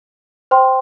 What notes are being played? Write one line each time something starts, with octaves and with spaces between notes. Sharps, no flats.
C5 G5 C6